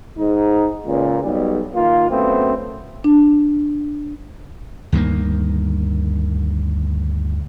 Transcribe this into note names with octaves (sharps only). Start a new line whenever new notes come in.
G#2 D#4
C#2 A#2
B1 G3
D#3 A#3 F4
F#2 A3 B3 C4
D4
D2 G2 D#3 A#3